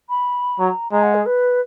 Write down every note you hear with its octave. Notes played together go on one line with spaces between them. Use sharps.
B5
F#3 A#5
G#3 A#5
F#5
G#4
B4